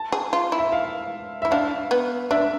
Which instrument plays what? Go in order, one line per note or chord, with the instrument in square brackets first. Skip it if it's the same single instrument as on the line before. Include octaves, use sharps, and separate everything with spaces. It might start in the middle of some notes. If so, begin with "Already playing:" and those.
Already playing: [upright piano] A5
[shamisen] G#4
F4
E4
[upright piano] E5
F5
[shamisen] E4 [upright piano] E5
[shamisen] D4 [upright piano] F5
[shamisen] B3
[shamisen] D4 [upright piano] E5